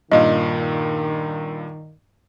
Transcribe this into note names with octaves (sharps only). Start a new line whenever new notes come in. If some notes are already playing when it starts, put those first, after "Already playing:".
G2 A#2 D#3 D#5 F5